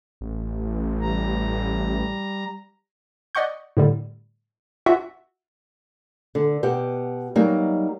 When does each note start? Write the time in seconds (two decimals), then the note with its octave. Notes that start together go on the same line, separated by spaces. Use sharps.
0.21 A1
1.01 G3 A#5
3.35 D5 D#5 F#5 C#6 G6
3.77 A2 D3 G3
4.86 F4 F#4 E5 F#5
6.35 D3
6.63 B2 G4 F#5
7.36 F#3 G3 A#3 D#4